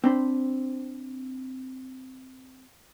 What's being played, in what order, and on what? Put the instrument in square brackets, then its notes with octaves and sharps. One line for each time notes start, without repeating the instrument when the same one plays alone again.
[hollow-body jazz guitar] C4 D4 C5 B5